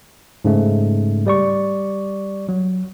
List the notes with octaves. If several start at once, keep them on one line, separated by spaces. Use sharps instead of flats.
G#2 C#3 A3
G3 D5 C#6
F#3